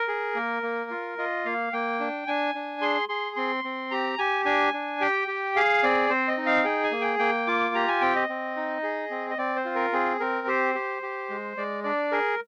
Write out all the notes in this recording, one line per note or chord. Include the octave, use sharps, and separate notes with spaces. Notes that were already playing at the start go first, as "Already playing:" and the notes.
Already playing: A#4
G#4
A#3
A#3
F4
F4 D#5
A#3 F5
A#3 G5
D4
D4 G#5
D4
G#4 C6
G#4 C6
C4 C6
C4
G4 A#5
G4 G#5
D4 G#5
D4
G4 G5
G4
G#4 F5
C4 D5
C4 C5
D#5
D#4
F5
G#4 G5
G#5
A#3
G5
A#3 G5
F4 D6
G4 A#5
G#5
C4 G5
D#5
C4
D#4
G#4
C4
D#5
C4 D5
C5
F4
A#4
C4 G#4
C4 A#4
G4 C5
G4
G4
G#3
G#3 D5
D4 D5
G#4 A#4